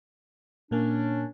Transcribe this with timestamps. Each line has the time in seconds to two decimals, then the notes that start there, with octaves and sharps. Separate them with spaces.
0.71 A#2 A#3 C#4 D4